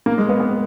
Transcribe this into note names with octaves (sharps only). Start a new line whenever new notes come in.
A#3
G#3
B3
B3